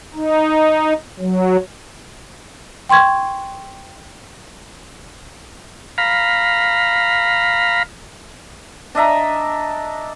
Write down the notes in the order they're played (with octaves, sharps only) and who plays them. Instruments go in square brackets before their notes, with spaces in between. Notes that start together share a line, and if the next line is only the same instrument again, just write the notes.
[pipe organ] D#4
F#3
[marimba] G5 C6 C#6 G#6
[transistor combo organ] F5 A#5 B5
[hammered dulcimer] D4 D#5 E5 A#5